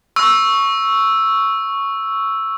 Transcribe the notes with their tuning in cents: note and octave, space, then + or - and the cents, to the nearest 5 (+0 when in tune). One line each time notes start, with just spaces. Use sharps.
C#6 +0 E6 +0